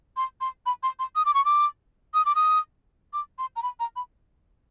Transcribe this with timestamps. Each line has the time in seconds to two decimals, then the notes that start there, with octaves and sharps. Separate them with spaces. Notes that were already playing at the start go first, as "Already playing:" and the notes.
0.17 C6
0.41 C6
0.66 B5
0.83 C6
0.99 C6
1.16 D#6
1.25 D6
1.34 C#6
1.45 D6
2.14 D#6
2.26 D6
2.35 D#6
3.13 D6
3.39 C6
3.56 A#5
3.63 B5
3.80 A#5
3.96 B5